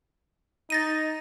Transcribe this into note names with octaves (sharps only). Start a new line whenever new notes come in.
D#4 A6 A#6 D#7